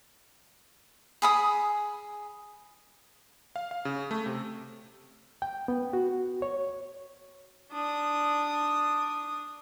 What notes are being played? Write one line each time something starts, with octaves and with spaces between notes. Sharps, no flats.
G#4 B5 D#6
F5
F5
C#3
A3
C3
G5
B3
F#4
C#5
D4 D#6